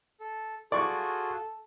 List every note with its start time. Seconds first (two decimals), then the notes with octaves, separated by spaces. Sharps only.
0.20 A4
0.72 F4 F#4 G#4 A4 D5 C#6